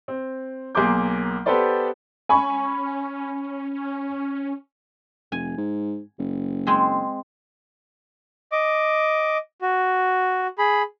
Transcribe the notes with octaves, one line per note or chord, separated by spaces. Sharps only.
C4
B1 A#3 G#4 C6 D6 G6
B3 G4 A4 B4 C5 D5
C#4 G#5 B5 C#6
F1 G#5
G#2
F#1
G#3 C4 G#4
D#5 D6
F#4
G#4 B5